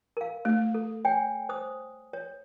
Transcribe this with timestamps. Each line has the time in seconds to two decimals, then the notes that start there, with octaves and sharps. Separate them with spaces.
0.17 A#4 F5
0.45 A3
0.74 A4
1.05 C#5 G5 G#5
1.49 C5 D#6
2.13 C#5